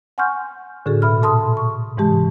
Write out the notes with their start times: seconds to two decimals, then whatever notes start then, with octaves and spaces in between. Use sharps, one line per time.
0.18 F#5 G#5 C6 C#6 F6 G6
0.86 A2 D3 D4 F#4 G#4 A4
1.02 B2 E5 B5 F6
1.22 A#2 A4 A5 C6 D#6
1.57 C#6
1.97 G#2 C3 E3 G#3 G4 A5